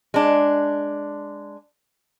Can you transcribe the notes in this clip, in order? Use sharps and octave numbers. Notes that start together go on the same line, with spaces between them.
G#3 D4